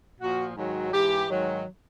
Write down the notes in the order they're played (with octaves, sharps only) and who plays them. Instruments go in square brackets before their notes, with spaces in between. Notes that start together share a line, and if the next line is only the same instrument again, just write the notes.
[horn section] A#2 F3 F#4
G#2 D#3 F#3
G#2 E3 G4
G#2 D#3 F#3